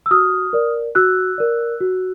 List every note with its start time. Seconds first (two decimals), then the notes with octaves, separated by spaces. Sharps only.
0.06 E6
0.11 F#4 D#6 F6
0.53 A#4 D5
0.95 F#4 E6 F#6
1.38 A#4 D5
1.81 F#4